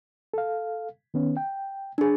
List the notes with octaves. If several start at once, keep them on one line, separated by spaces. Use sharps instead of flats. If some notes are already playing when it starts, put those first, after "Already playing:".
A4 F5
D#3 B3 C#4
G5
D4 G#4